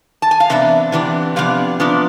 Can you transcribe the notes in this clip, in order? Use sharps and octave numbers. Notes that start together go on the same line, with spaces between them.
A5
G#5
F5
C3 E3 B3 D4 E5
C3 E3 B3 D4
C3 F3 B3 D4 F5
C3 F3 B3 D4